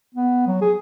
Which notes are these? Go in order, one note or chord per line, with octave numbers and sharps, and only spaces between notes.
B3
F#3
G#4